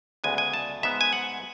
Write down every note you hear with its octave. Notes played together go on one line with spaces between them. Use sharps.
D2 C#3 G#3 B3 G#5
G#5
A5
G#2 G#3 B3 E5
G#5
F#5